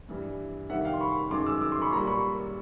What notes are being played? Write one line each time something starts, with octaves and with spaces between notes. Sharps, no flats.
G2 E3 G3
F2 C3 D#3 G3 E5 F#5
F5 G5
C6
B5 C#6
F#2 D#3 G#3 C6 D6
D6 E6
D6 E6
C6 D6
B5 C#6
A#2 G3 A#5 C6
B5 C#6